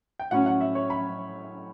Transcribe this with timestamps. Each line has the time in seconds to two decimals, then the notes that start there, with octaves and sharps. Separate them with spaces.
0.19 G5
0.31 A2 F#3 C#4 F#5
0.46 F#5
0.61 E5
0.75 C#5
0.90 B5